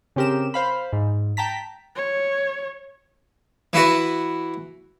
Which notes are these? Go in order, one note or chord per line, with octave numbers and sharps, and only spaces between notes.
C#3 C4 G4 A#4 E7
C5 F5 B5
G#2
G5 A5 A#5 B6
C#5
E3 E4 F#4 B4